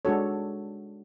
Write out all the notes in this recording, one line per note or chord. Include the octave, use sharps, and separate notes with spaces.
G#3 D4 F#4 A4 C#5